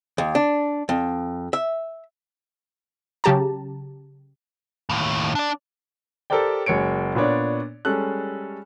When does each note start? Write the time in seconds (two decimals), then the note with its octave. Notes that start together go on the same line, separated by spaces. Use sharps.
0.18 D#2
0.35 D4
0.89 F2
1.53 E5
3.24 C#3 F#3 G4 A5 A#5
4.89 D#2 A2
5.35 D4 D5
6.30 G4 A4 A#4 C5 D5 G5
6.66 F#1 G#3 C#5 C#7 D7
7.15 A#2 B3 D4 C#5 D5
7.85 G3 G#3 C#4 A4 F#6